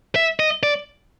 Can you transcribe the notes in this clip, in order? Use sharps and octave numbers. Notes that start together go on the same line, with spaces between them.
E5
D#5
D5